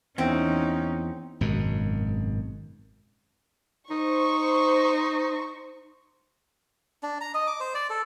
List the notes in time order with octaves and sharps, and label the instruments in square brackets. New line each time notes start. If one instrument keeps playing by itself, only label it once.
[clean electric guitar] E2 [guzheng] C4 [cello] C#4 D#4
[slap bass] G#1 F#2 B2
[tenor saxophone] D#4 [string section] C5 C#6
[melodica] D4
A#5
D#5
D6
C5
D5
A4